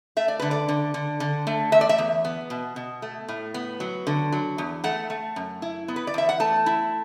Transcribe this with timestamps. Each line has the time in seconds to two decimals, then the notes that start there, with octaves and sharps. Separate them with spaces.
0.17 A3 E5
0.28 D5
0.39 D3 B4
0.51 D5
0.69 D3
0.94 D3
1.20 D3
1.47 A3
1.72 E2 E5
1.81 D5
1.89 E5
1.98 E2
2.25 B3
2.50 B2
2.76 B2
3.02 A3
3.29 A2
3.54 B3
3.80 F#3
4.07 D3
4.32 F#3
4.58 E2
4.84 A3 F#5
5.10 A3
5.36 F#2
5.62 E4
5.88 B3
5.96 B4
6.07 D5
6.14 E2 E5
6.29 F#5
6.40 A3 A5
6.66 E4